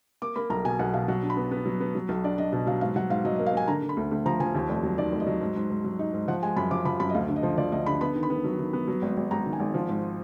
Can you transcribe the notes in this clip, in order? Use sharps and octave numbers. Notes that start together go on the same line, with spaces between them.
A#3 D6
A#3 B5
B1 A#5
B2 G#5
B1 F#5
B2 F5
F#3 F#5
D4
B5
B3
B3
F#3
B3
F#3
B1
D4 D5
D4 D#5
B2 D#5
F#3 F5
G#2 F5
F#3 F#5
G#2 F5
F#3 D#5
D#5
A#3
F5
A#3 G#5
D3 A#5
D3
B5
D2
D2
F3 A#5
F3 G#5
D#2
F1
F#3
D#3 D5
F1
D#5
F#3
G#2
G#2
G#2
F#3
D#4
G#2
F3 F#5
G#3 G#5
F#2 B5
F3 D6
F3 B5
F#2 B5
D#5
D2 F5
D3
D#5
F3
F3 D5
D2 D#5
D3 B5
B3 B5
D#3
B5
B3
F#3
D#3
B3
F#3
G#1
G#1
G#1 A#5
D#3
G#5
G#1
F3
G#2